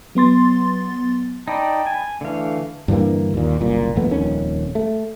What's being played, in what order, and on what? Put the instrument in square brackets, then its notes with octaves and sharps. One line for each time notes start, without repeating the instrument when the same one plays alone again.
[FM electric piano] F#3 B3 C6 A6
[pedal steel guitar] D#4 D5 [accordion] G5 A5 B5
[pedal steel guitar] G#5
[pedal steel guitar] D3 F5 [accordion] E3 A3
[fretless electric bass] G2 D3 E3 A#3
D#2 A#2
F#1 C2 A#2
A#1 F2 A3 B3
D#1 F2 D#3 C#4
A3